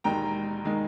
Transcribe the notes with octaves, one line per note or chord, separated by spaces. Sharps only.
E1 D#2 D#3 G#3 D#4 G5 A#5
D#3 G#3 D#4